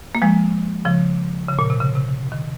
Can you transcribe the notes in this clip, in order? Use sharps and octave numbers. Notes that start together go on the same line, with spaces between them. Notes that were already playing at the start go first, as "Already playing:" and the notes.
A#3
F3 G#3
C#3 F3
C#3
A#2
C3
C#3
C3
D#3